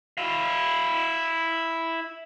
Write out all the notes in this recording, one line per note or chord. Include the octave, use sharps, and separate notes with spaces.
E4 F5